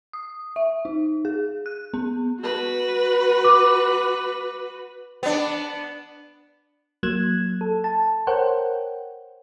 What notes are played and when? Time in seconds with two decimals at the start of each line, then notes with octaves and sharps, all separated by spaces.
0.13 D#6
0.56 E5
0.85 D#4
1.25 G#4
1.66 F#6
1.94 B3
2.40 F#4 B4
3.44 D6
5.23 B3 D4
7.03 F#3 A#3 F#6 G#6 E7
7.61 A4
7.84 A5
8.27 A#4 C5 C#5 F#5 G5